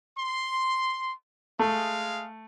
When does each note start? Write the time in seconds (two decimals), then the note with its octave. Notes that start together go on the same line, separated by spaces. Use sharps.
0.17 C6
1.59 G#3 A3 G#4 F5